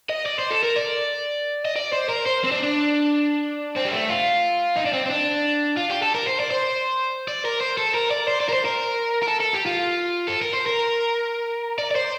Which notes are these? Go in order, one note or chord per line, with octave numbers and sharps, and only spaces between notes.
D#5
D5
C5
A4
A#4
D5
D#5
D5
C5
A#4
C5
C4
D4
D4
C4
G3
A3
F4
D#4
D4
C4
C4
D4
F4
G4
A4
A#4
C5
D5
C5
D5
A#4
C5
A4
A#4
D5
C5
D5
A#4
C5
A#4
A#4
A4
A4
G4
F4
A4
A#4
C5
A#4
D5
D5
C5